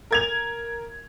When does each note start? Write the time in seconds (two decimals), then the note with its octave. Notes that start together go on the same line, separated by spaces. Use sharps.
0.11 A#4 G#6 F7